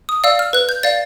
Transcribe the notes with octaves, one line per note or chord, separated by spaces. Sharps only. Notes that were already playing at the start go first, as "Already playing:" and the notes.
D#6
D5 F5 E6
F6
B4 F#6
G6
D5 F5 A6